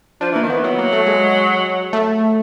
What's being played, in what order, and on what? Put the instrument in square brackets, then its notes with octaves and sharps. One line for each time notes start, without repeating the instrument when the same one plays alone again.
[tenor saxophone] F3 [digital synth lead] D4
[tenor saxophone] E3
[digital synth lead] A#3
[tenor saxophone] D#3
[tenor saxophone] E3 [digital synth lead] B3
[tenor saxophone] F#3 [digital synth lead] B3
[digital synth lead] A#3
A3
G#3
A3